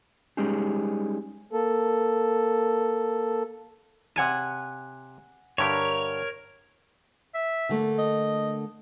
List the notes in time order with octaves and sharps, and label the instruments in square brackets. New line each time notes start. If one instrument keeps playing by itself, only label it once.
[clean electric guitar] G3 G#3 C#4 D#4 G4 G#4
[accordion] A#3 A4
[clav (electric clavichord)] C3 C#5 A5 [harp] F#5 G#5 D#7
[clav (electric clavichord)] G2 D3 G4 [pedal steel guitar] A#4 C#5
[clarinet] E5
[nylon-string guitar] D3 A3 A#3
[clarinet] D#5